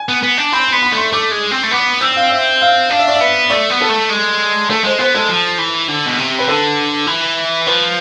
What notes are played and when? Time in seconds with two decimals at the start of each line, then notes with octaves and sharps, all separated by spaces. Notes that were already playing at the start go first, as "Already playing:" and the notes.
Already playing: G#5
0.09 B3
0.23 B3
0.37 D4
0.52 C4 B5
0.67 C6
0.72 B3
0.82 B5
0.92 A3
0.97 C6
1.12 A3 D6
1.32 G#3
1.52 C4
1.64 A3
1.72 B3 D6
2.01 C4 E6
2.16 F5
2.31 E5
2.61 F5
2.90 D4 F5
2.99 E5
3.08 D5
3.16 E5
3.21 B3
3.50 A3 D5
3.70 B3
3.81 A4
3.89 A3
4.10 G#3
4.69 A3 A4
4.84 G#3 C5
4.99 B3 C5
5.15 G#3 A4
5.29 F3
5.58 E3
5.88 D3
6.06 B2
6.19 C3
6.39 B4
6.48 D3 A4
7.07 E3
7.66 F3 B4